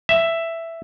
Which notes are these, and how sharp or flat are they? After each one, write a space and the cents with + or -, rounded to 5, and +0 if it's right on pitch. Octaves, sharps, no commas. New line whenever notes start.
E5 +5